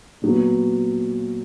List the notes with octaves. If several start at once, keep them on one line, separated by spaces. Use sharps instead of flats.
A#2 F#3 B3